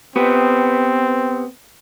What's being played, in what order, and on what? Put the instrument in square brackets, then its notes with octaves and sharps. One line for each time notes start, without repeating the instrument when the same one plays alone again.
[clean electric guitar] B3 G4 B4 [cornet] C4